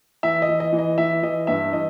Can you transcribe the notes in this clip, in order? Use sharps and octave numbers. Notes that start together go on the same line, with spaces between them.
E3 E5
D#5
E3
D#5
E3
D#5
E3 E5
E3 D#5
G2 E5
E3 D#5